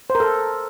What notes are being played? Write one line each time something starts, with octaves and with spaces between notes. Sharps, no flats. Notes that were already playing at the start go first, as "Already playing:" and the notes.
C5
A#4
A4